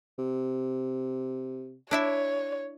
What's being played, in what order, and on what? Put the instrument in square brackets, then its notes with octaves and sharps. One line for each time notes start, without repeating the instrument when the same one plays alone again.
[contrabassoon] C3
[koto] D4 E4 E5 [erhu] C#5